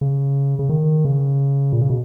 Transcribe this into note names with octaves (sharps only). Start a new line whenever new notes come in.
C#3
C#3
D#3
C#3
A#2
C#3
B2